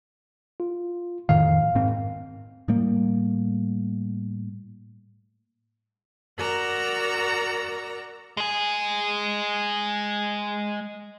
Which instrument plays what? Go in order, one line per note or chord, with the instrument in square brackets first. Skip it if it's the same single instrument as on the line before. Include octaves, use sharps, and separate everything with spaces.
[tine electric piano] F4
[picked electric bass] F2 A2 D#3 [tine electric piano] F5
[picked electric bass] G#2 C4
A2 G3 A#3
[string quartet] F#4 A#4 D5 F#5 A#5 E6
[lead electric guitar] G#3 G#4